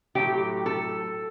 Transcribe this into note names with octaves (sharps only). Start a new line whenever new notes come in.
A2 F#3 A3 G4
A4